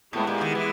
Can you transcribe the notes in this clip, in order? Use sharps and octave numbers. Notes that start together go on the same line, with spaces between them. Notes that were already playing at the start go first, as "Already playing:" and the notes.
A2 G#3 B3 E4 G4
A#2
D#3
E3